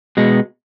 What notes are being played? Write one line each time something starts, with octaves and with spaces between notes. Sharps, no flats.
B2 G#3 B3